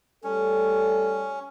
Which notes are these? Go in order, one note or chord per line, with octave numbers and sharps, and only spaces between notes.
G3 A3 C#4 A4